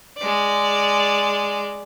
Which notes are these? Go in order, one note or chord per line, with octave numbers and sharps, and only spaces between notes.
G#3 D5